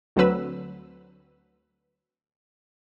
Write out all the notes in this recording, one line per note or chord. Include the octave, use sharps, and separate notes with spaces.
D2 D3 F#3 C4 B4 E6